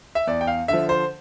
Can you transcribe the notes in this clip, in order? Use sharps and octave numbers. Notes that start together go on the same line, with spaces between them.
E5
E2 D5
G5
F5
D3 F3 E5
C5